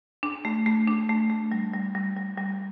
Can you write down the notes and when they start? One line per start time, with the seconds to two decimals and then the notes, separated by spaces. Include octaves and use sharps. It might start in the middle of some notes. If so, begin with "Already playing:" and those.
0.23 D4
0.45 A3
0.66 A3
0.87 D4
1.09 A3
1.30 A3
1.52 G3
1.73 G3
1.95 G3
2.16 G3
2.37 G3